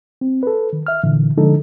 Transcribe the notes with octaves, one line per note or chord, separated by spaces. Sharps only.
C4
A4 B4
D#3
E5 F6
A#2 D3 E3
D3 F3 G#3 D4 D#4 A4